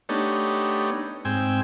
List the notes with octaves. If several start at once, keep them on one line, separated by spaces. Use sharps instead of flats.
A3 B3 D4 D#4 G4 C#5
G#2 C4 G5 G#5 E6